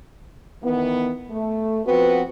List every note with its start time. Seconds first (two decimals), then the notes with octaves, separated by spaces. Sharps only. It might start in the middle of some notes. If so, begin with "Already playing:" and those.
0.63 D#3 E3 B3
1.30 A3
1.86 F3 B3 C4 F#4 B4